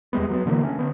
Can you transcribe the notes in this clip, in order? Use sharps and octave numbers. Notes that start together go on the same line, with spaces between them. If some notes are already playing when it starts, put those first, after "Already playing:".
E2 G3 G#3 B3
F#3 A#3 B3
B2 D3 E3 A#3
A3 C#4
D3 B3